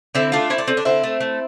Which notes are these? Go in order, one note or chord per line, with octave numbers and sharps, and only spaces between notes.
D3 C4 E4
A3 D4 F4
A3 C4 E4
D4
D3 C4
D4
D3 C4 E4
A3
A3